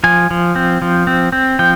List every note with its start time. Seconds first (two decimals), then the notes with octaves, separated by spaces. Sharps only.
0.04 F3 G#5
0.31 F3
0.56 C4
0.82 F3
1.07 C4
1.32 C4
1.59 F3 G5